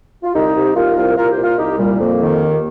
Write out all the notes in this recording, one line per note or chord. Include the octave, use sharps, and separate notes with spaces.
F4
C2 D#4 G4
C2
C2 F4 A#4
C2
C2 F4 A#4
G4 C5
A#2
F4 A#4
C2 D#4 G4
A#2 G3
F2 A#3
D#3
D#2